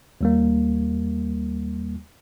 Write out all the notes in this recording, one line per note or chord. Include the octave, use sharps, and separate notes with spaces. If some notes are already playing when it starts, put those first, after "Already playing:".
D#2 G3 A#3